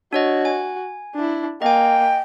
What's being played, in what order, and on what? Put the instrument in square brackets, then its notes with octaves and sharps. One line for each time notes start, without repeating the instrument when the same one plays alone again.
[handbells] D4 C#5 D#5 [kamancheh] F#4
[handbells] G#5
[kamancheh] D4 E4
[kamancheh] A#3 [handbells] D#5 G#5 [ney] G5